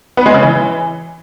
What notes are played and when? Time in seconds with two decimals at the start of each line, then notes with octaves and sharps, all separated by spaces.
0.17 B3
0.26 G#3
0.34 C#3
0.43 E3